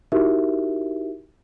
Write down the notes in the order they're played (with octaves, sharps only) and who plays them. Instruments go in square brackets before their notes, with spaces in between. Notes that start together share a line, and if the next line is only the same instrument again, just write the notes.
[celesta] D#4 E4 F#4 G4 A#4 E5